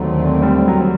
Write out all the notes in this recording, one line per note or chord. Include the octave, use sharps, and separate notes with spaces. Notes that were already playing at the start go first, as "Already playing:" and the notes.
Already playing: D#2 D3 F#3 A3 C4
G3
F#3